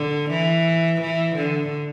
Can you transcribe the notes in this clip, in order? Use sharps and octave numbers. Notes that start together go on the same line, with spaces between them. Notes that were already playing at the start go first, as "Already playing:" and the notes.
Already playing: D3
E3
E3
D3